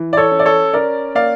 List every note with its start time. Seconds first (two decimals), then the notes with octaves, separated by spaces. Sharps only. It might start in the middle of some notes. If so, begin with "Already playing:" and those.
Already playing: E3
0.13 D5
0.17 A4 C#5
0.31 C#4
0.39 D5
0.45 A4 C#5
0.73 C#4 A#4 D5
1.15 A#3 D5 F5